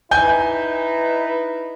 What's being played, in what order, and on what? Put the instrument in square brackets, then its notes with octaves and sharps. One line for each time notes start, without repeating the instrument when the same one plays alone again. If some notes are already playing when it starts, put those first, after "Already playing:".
[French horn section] D#4 E4 B4 [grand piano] G#5 G6